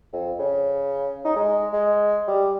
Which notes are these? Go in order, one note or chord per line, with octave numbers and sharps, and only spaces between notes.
F2
C#3
D#4
G#3
G#3
G3